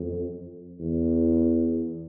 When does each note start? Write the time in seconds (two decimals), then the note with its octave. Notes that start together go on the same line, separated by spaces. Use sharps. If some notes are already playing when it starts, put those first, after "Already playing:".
Already playing: F2
0.80 E2